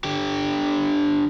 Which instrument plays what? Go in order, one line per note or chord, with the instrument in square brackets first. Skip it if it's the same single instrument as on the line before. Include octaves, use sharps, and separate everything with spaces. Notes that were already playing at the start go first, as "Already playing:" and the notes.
[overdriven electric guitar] D3 G4